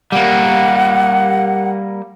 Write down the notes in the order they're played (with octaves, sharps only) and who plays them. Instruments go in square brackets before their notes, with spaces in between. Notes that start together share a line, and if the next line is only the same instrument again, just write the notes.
[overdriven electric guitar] G3 A#3 [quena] F#5